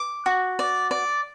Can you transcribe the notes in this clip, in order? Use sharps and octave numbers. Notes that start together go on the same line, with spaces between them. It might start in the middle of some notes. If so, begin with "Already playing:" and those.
Already playing: D6
F#4
D5
D5